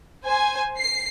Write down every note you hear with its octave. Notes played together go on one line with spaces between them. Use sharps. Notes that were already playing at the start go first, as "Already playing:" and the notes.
C5 G#5
C7